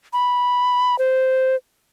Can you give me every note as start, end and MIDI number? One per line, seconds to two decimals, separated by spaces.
0.13 0.98 83
0.99 1.56 72